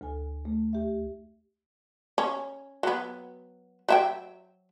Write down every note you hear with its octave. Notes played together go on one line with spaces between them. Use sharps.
D2 A4 G#5
A3
D#2 G4 E5
C#4
F#3 B3
F#3 E5 G5